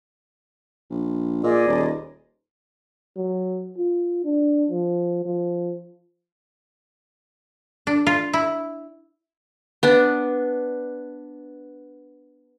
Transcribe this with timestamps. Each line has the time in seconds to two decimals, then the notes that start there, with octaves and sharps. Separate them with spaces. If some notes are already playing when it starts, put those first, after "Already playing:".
0.90 A#1
1.43 A#2 G#4 D5 D#5
1.67 D#1
3.17 F#3
3.78 F4
4.25 D4
4.70 F3
5.25 F3
7.87 D4
8.07 F4
8.33 E4
9.83 B3 D4